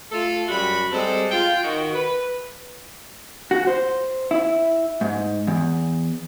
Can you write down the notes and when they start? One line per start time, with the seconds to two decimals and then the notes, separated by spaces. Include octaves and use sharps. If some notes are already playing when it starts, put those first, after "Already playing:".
0.10 A3 F4 A4
0.48 F#2 G3 F#4 B5
0.90 G3 G#3 C4 A4
1.30 F4 G5
1.62 D#3 F#4
1.92 B4
3.51 F#4
3.67 C5
4.31 E4
5.01 G#2
5.47 E2